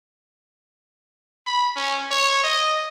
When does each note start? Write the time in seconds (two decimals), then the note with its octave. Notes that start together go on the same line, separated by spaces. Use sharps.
1.47 B5
1.76 C#4
2.11 C#5
2.44 D#5